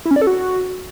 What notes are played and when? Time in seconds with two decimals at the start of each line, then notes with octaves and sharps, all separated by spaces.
0.05 E4
0.11 C#4
0.16 D5
0.22 A4
0.27 F#4